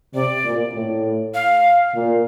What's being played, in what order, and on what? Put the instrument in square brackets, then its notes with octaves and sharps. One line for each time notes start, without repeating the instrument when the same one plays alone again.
[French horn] C3 [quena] D5
[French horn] A#2
A2
[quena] F5
[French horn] A#2